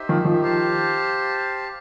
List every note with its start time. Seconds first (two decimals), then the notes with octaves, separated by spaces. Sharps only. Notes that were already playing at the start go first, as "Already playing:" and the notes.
Already playing: D#4 G4 C5 E5
0.09 D#3 F3
0.25 D#3 F3
0.41 G4 C5 F5 A5